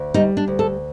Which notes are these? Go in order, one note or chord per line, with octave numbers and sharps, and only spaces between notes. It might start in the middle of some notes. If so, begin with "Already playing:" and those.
Already playing: D2
G3 D#4
D4
D2
A4